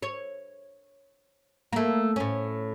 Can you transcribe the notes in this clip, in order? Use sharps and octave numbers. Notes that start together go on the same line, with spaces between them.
C#5
A3 A#3
A2 C#4